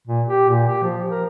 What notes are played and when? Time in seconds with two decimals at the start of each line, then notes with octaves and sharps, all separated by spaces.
0.07 A#2
0.28 G4
0.49 A#2
0.68 G4
0.82 F3
1.10 A#4